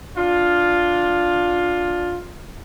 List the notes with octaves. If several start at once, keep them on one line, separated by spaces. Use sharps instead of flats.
D4 F4